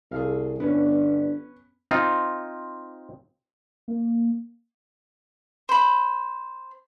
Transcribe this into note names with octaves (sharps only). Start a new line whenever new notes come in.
C2 G#4 A4 F5
G1 B3 C#4 D4
C4 D#4 F4
A#3
C5 B5